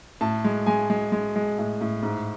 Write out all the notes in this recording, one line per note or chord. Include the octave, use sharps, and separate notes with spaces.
A2 A5
G#3
G#3 G#5
G#3
G#3
G#3
A2
A2
G#2